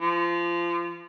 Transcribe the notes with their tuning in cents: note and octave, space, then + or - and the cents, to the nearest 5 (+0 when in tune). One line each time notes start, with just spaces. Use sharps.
F3 -25